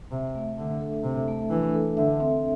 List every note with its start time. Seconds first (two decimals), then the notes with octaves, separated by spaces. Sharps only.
0.11 C3 E5
0.35 A3
0.58 D3 D4
0.81 A4
1.04 C3 E5
1.28 A3
1.51 E3 D4
1.74 A4
1.97 D3 E5
2.20 C4